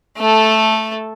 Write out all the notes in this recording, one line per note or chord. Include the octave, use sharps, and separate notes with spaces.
A3 A4